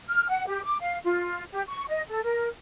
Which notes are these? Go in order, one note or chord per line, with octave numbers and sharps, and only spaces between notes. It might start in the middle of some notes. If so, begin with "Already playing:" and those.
F6
F#5
G4
D6
F5
F4
G4
C#6
D#5
A4
A#4